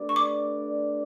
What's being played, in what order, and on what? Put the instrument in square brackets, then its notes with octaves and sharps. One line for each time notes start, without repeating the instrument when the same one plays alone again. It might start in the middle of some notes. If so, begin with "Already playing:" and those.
Already playing: [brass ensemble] A3 D4 G4 B4 D5
[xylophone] C#6
D6